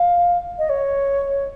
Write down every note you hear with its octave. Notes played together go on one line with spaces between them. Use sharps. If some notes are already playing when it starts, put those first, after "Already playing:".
Already playing: F5
D#5
C#5